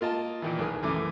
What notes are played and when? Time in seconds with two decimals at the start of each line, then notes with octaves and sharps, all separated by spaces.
0.01 A#3 F4 D#5 A5
0.42 A#2 D#3 E3
0.59 B1 G#4 A#4 D#6
0.83 F#2 C#3 E3 A3 D6